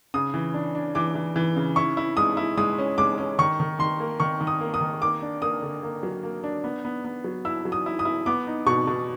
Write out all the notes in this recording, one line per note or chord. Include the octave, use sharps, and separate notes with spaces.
C#3 D#6
E3
D4
D4
E3 D6
E3
E3
C#3
E4 C#6
E4
G#3 D#6
E4
G#3 D#6
C#4
G#3 D6
C#4
D#3 C#6
D#3
D#3 C6
A#3
D#3 C#6
D#3
D#6
A#3
D#6
D#3
A#3 D6
D4
A#3 D#6
D3
A#3
F#3
A#3
D4
B3
B3
B3
F#3
E4 E6
F#3
D#6
E4
D#6
E4
B3 D6
D#4
B2 C#6
B2